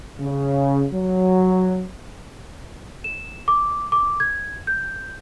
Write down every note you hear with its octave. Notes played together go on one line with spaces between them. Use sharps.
C#3
F#3
E7
D6
D6
G#6
G6